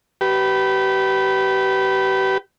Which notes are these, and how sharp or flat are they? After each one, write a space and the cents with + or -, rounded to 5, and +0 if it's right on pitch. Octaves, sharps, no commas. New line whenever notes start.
G4 -30 B4 +0